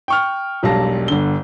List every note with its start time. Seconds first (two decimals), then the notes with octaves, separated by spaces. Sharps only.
0.08 G5 C#6 F6
0.63 E1 B1 G3 F5 A5 A#6
1.08 G1 D3 G7